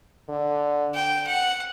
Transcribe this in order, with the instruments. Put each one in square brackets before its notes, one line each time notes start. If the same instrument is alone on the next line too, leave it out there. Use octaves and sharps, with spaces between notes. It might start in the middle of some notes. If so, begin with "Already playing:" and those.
[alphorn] D3
[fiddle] G5
F#5